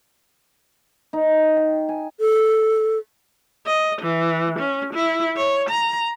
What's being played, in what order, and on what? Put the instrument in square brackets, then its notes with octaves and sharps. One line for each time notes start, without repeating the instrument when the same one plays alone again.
[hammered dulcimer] D#4
G5
G#5
[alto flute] A4
[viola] D#5
E3
C#4
E4
C#5
A#5